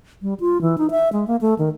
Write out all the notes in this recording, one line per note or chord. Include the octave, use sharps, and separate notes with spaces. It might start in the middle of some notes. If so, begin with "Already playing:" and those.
G3
F4
E3
D#4
E5
G#3
A#3
A3
D#3